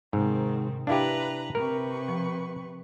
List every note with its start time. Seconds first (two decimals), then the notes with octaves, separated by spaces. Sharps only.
0.13 G#2 C3 D#3 C4
0.87 D4 E4 G4 B4 F5 A#5 F#6
1.55 C3 A#4 B4 C#6
2.08 F3